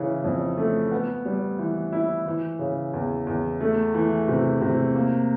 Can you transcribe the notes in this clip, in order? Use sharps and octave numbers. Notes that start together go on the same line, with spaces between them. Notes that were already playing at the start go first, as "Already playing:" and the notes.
Already playing: C#3 E3
F2
A3
B3
G3
E3
E4
E3
C#3
E2
E2
A3
E3
C3
C3
A#3